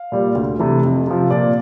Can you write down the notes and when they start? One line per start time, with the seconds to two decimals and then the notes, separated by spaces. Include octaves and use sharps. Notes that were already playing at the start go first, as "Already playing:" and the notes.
Already playing: F5
0.12 A#2 G3
0.35 D2
0.59 C3 E3 A3
0.83 F2
1.07 C3 F3
1.31 A#2 D5